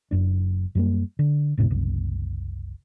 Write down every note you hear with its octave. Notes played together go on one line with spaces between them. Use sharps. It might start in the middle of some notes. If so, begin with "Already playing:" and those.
F#1 F#2 D4
F#2 G3 A#3
D3
G#1 F2 A2 C3
F#1 C2